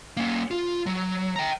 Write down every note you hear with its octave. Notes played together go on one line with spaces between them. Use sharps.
A#3 C#4
F4
F#3
G5 A#5